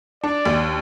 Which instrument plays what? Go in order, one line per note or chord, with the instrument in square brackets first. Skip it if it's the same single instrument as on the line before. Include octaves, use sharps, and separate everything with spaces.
[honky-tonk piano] D4 [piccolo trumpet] D5
[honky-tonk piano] D#2